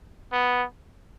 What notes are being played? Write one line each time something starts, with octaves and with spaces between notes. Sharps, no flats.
B3